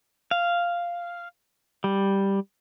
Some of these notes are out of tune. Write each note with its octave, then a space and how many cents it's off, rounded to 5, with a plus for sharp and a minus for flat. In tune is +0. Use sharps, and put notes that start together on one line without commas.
F5 -5
G3 +0